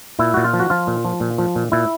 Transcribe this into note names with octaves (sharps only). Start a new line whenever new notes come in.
A#2 E4
A#2 F#4
F4
F3
F#4
F3 F4
A#2
F3
A#2
F3
A#2
A#2 E4